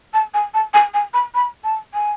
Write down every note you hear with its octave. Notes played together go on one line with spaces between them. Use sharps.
A5
G#5
A5
G#5
G#5
B5
B5
A5
G#5